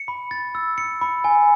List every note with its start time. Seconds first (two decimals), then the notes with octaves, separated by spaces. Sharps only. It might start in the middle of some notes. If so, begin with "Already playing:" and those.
Already playing: C#7
0.08 B5
0.31 A6
0.55 E6
0.78 C#7
1.01 B5
1.24 G#5